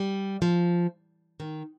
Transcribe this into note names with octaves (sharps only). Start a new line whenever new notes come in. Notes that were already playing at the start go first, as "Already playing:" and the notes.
Already playing: G3
F3
D#3